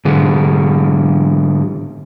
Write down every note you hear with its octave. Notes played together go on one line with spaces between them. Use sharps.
G#2 D3